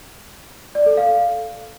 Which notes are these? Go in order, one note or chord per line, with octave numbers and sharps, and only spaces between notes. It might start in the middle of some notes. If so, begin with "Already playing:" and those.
D5
A4
F5